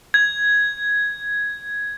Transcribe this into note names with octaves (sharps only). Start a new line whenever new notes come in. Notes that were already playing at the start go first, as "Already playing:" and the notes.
G#6